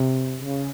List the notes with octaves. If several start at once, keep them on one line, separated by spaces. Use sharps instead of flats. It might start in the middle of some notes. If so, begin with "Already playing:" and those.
Already playing: C3
C#3